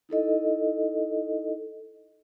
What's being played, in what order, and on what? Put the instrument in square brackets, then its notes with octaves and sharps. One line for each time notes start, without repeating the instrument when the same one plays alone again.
[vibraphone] D#4 E4 A4 D#5